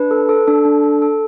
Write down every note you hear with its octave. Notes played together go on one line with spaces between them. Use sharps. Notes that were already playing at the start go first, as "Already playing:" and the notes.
Already playing: D4 B4
A4
A4
D4 A4
D4
A4
A4